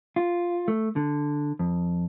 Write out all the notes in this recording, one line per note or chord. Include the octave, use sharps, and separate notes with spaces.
F4
A3
D3
F2